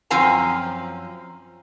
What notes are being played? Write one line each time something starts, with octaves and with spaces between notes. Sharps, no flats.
F#2 F3 C4 F5 G#5 A#5